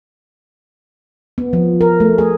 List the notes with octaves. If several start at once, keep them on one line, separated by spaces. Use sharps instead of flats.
B3
F3
A#4
A3
G#4